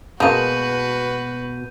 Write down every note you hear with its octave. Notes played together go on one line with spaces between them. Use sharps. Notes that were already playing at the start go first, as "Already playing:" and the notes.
B2 G#3 A#3 F#4 B4 A5 G6 D#7